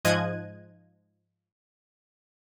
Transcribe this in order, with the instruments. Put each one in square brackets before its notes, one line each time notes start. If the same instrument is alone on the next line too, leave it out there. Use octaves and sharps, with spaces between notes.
[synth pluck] G#2 F3 D#5 F#6 G#6 D#7